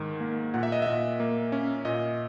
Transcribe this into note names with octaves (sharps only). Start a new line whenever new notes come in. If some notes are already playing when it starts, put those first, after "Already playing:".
Already playing: G#2 D#3
A#3
A#2 F#5
E5
D#5
A#2 E5
A#3
C#4
A#2 D#5